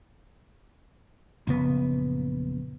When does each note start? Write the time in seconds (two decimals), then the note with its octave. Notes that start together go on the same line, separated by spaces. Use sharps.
1.47 A#1 F#2 C#3 B3